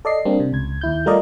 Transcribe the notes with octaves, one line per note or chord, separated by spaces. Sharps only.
A4 D5 D#5 C7
G3 A#3 C4 D4
C3
C#2 G#6
D#2 E4 G6
G3 A3 F4 A#4 D5 D#5